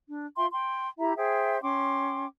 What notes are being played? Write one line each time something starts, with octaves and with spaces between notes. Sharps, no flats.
D4
F4 E5 G5 C6
G5 C6
E4 G4 E5 A#5
G#4 C5 E5 G5
C#4 G5 C6 D6